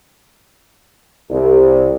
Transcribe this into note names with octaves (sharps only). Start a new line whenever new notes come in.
C2